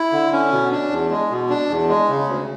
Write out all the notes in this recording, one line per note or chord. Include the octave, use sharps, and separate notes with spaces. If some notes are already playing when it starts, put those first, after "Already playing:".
Already playing: E4
D3
C#4
B2
D4
E2
G#3
B2
D4
E2
G#3
C#3
D2